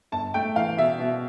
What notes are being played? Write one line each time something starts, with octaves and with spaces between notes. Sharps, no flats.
G1 A5
A3 G5
E3 F5
B2 E5
B2